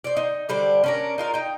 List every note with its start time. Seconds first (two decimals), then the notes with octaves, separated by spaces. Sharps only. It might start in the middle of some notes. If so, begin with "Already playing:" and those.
0.04 C5 D5
0.17 D#4
0.49 D3 G3 D4 C5
0.84 C#4 D4 A#4
1.18 D#4 F4 A#4
1.34 D#4 G5